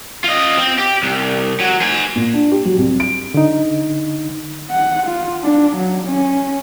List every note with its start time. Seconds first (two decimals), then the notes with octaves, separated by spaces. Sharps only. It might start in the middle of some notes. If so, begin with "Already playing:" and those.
0.24 F4 D#5
0.58 C4
0.79 G4
1.03 C2
1.60 F#3
1.81 C5 G#5
2.16 A#2
2.34 D4
2.52 G4
2.65 F#3
2.78 C2
3.00 D7
3.34 D3 D#4
4.71 F#5
5.07 F4
5.44 D4
5.77 F#3
6.07 C#4